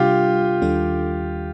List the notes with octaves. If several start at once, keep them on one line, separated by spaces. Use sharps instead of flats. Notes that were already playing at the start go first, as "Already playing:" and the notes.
Already playing: C3 G3 D4 F4 G4
D#2 D#3 G3 D4 A4